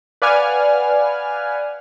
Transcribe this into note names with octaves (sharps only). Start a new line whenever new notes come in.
B4 D5 F5 F#5 G#5 F6